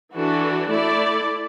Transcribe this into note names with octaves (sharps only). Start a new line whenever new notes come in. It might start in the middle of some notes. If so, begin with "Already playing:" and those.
E3 D4 F#4 A4
A3 E4 A4 D5